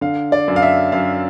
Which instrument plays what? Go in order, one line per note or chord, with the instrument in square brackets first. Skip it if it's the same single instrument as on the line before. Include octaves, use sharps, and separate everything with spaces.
[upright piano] D3 F5
D5
F#2
F5
E5
F#2 F5